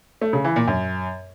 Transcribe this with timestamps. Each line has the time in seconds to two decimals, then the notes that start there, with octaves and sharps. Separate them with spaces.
0.21 A3
0.33 C#3
0.44 E3
0.56 A#2
0.67 F#2